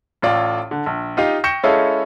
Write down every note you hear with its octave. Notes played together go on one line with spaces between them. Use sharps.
A1 A2 F4 D5
D3
A#1
D#4 F4 G4 D#5 F5
G5 C#6 G6 A#6 C#7 E7
G#3 C#4 E4 A4 D#5 F5